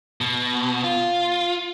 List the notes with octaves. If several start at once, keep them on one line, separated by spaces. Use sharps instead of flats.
B2
F4